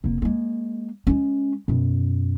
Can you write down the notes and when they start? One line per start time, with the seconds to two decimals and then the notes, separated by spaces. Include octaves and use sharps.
0.04 F1 A#3
0.22 G#3 A#3
1.07 G#3 C#4
1.68 F#2 B2